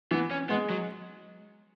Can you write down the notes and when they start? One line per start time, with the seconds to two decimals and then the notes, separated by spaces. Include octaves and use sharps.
0.11 E3 B3
0.31 C#4
0.49 G#3 B3
0.70 F#3